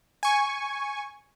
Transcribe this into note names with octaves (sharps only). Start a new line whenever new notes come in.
G#5 C#6